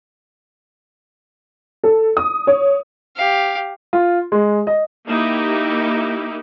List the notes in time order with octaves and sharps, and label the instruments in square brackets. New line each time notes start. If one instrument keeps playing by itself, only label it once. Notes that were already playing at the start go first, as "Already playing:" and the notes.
[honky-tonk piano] A4
D#6
C#5
[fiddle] G4 F5
[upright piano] F4
G#3
D#5
[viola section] A#3 D#4 E4 G4